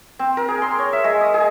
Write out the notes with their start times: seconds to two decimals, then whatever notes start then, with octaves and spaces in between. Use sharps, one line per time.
0.19 C4
0.37 A#4
0.48 G#4
0.62 C6
0.79 C#5
0.93 E5
1.04 G#3
1.21 D#6
1.34 G#4